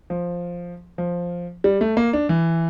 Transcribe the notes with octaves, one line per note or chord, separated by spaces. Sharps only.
F3
F3
G3
A3
A#3
D4
E3